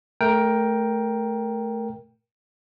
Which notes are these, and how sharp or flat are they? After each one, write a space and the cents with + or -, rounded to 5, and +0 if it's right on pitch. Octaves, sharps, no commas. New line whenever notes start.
A3 -10 A#4 +10 G5 +0